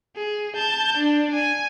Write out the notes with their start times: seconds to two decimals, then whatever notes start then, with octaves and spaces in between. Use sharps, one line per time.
0.16 G#4
0.56 A5 G6
0.97 D4
1.34 G#5